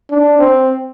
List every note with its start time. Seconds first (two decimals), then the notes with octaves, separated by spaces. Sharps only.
0.11 D4
0.39 C4